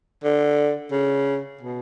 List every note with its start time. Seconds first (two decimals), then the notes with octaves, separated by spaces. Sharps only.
0.24 D3
0.92 C#3
1.61 B2